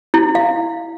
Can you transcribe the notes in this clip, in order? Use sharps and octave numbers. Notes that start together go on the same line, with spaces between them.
E4
F5